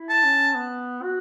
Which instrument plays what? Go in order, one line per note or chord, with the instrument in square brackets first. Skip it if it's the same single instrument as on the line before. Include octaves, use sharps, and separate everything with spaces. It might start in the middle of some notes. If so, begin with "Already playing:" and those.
Already playing: [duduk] E4
[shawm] A5
[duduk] C#4
B3
F#4